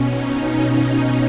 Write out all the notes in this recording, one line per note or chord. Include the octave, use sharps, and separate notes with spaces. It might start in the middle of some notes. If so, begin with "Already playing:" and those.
Already playing: B2 C#4
D#4